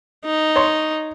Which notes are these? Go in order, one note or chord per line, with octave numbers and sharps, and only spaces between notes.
D#4
C#5 C6